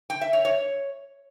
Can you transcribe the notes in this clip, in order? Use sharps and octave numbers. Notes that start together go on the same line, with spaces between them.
G5
E5
C#5
C#5